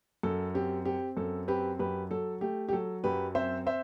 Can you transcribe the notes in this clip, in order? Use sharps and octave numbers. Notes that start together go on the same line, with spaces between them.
F#2 A4
C4 G4
C4 G4
F#2 A4
C4 G4 B4
F#2 G4 B4
F#3 A4
A3 G4
G4
F#3 A4
F#2 G4 B4
C4 C5 E5
C5 E5